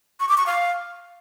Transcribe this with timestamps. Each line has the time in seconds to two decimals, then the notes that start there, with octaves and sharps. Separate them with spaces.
0.20 C#6
0.29 D6
0.38 C#6
0.46 F5